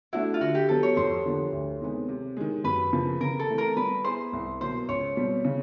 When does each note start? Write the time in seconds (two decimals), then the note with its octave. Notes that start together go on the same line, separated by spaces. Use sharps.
0.13 A3 D4 E4 F#4
0.34 F4
0.41 D3 F#4
0.55 G4
0.69 F#3 B3 A4
0.83 C#5
0.97 F2 C5
1.25 D3 F3 A#3 D4
1.53 D2
1.81 C3 D#3 G#3 B3
2.08 C3
2.37 D#3 G#3
2.64 F#2 B4
2.93 C#3 F3 A#3
3.21 C#3 A#4
3.39 A4
3.49 E3 A3 C4
3.58 A#4
3.77 G3 B4
4.04 B3 E4 G#4 C5
4.33 C2
4.61 B2 F#3 A#3 C5
4.89 C#2 C#5
5.17 B2 G3 C4
5.45 C#3